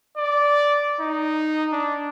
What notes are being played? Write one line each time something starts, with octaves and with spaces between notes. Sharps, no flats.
D5
D#4
D4